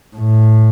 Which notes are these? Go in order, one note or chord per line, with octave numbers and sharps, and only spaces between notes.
A2